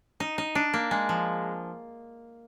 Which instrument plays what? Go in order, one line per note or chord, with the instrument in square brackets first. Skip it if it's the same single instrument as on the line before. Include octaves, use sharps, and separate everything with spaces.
[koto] D#4
D#4
D4
A#3
G#3
F3